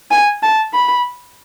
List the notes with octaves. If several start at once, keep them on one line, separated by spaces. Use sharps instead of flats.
G#5
A5
B5